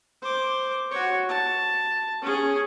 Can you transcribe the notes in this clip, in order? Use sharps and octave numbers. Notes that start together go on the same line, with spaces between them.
C5 D6
F#4 C#5
A5
C#4 G#4